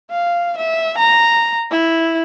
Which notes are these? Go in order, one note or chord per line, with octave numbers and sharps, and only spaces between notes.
F5
E5
A#5
E4